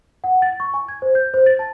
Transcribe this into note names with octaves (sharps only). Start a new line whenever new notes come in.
F#5
A6
C#6
G#5
G#6
C5
G6
C5
A6
A5